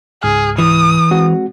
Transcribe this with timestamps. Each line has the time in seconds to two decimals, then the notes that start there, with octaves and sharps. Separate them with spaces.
0.23 C#2 G#2 G#4 F6
0.58 E3 D#6
1.11 G#3 C4 F#4